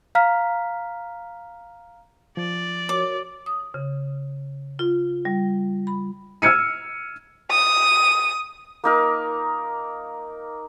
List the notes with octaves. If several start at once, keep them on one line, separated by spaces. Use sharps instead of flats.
F5 A#5 F6 B6
F3 D5
F#4 A#4 C#5 D6
D#6
C#3
F4
G3
B5
E6 F6 G#6 C#7 D#7
D#6
A#3 D#4 A#4